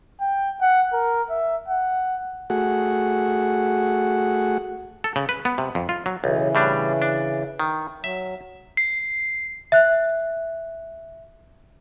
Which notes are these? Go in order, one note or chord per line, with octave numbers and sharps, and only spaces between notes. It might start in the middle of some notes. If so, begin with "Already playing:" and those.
G5
F#5
A#4
E5
F#5
A3 F#4 G#4 F#5
A4
C#3
B4
B3
C3
F2
F4
F#3
B1 C#3 E3
A2 G3 D4
D4
D#3
F#3 E5
C7
E5 F#6